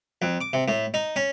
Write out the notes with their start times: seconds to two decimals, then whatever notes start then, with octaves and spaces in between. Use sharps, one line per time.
0.22 F2
0.41 D6
0.53 C3
0.68 A2
0.94 D#4
1.16 C#4